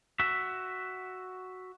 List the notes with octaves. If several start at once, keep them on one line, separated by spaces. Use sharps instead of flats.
F#4 E5